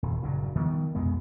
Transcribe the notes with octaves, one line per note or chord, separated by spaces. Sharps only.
D#1
F#1 G2 A#2
D#3 F3 G3 B3
B1 F2 G#3 B3